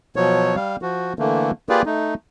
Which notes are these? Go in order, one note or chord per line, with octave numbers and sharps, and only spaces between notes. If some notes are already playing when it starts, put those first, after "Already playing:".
B2 F3 F#3 C#5
G3 F5
F3 F#4
D3 E3 A3 A#3
A#3 F4 G4 G#4 B4 D5
A3 D#4